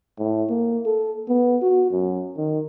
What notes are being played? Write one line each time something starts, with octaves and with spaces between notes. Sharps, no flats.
A2
A#3
A4
B3
F#4
F#2
D#3